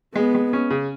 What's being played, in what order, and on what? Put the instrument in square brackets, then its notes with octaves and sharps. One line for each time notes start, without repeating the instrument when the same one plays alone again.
[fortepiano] G#3 [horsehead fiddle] B3
[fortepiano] G#3
C#4
C#3